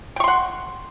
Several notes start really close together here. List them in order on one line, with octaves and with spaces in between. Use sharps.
G5 C#6 C6 F#5